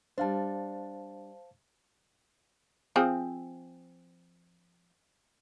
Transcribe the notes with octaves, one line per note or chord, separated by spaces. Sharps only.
G3 D4 C5 F5 A5
F3 C4 G#4